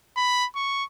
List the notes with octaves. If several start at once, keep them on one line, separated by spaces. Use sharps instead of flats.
B5
C#6